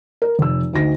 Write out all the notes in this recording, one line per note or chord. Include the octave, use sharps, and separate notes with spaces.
A#4
F1 E6
D2 D#4 A#6